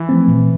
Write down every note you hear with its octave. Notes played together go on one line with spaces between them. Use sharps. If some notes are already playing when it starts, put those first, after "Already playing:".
Already playing: E3
F3 A3 C4
A#2